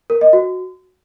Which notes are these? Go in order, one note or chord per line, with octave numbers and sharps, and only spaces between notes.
A#4
D#5
F#4